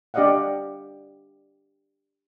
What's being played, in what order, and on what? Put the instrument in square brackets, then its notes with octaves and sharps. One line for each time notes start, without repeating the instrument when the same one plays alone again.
[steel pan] D4 G4 D5 D#5 F5 F#5